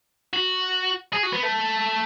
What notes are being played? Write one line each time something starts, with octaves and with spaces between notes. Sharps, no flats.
F#4
G#4
F#4
B3
A3